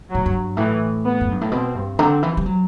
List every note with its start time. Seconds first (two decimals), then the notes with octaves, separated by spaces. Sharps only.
0.10 A2 F#3
0.26 G2
0.57 A2 E3
1.04 B3
1.21 F#2
1.31 G2
1.41 A2
1.51 B2 C4
1.75 G2
1.98 D3 C4
2.23 E3
2.37 G3
2.46 F#3